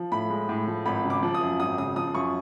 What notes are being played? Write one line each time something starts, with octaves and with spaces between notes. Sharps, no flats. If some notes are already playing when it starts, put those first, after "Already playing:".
Already playing: F3
A2 B5
G#3
A2
F3
G#1 B5
C#3
D6
F3
D#6
F#2
G#1 D#6
C#3 D#6
F3 D#6
F#2 C#6